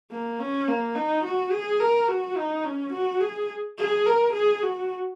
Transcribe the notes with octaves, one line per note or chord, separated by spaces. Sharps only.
A#3
C#4
A#3
D#4
F#4
G#4
A#4
F#4
D#4
C#4
F#4
G#4
G#4
A#4
G#4
F#4